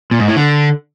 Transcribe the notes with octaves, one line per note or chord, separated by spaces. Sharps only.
A#2
G#2
A2
D3